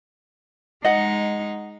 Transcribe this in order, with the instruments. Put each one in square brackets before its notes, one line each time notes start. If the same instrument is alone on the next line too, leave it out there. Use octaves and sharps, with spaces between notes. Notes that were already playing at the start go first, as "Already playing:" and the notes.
[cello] G#3 D#4 [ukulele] D#5 F#5